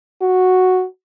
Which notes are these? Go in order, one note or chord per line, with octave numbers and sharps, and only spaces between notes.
F#4